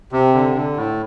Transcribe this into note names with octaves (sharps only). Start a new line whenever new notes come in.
C3
D3
D3
A2